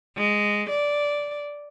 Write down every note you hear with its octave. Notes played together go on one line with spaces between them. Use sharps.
G#3
D5